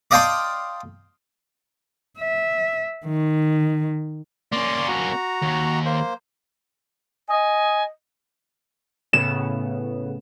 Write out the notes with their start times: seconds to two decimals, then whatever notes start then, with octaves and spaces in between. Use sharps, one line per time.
0.11 D5 D#5 F5 G5 A5 C6
2.19 E5
3.06 D#3
4.52 A#3 C#4 D5 C6
4.88 F#4 A#5
5.42 D#2
5.85 A#3 C5
7.28 D#5 G#5
9.13 A2 C#3 B3 E7